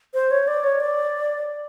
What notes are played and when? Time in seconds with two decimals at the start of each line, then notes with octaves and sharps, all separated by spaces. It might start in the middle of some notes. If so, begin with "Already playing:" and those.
0.14 C5
0.31 C#5
0.47 D5
0.64 C#5
0.80 D5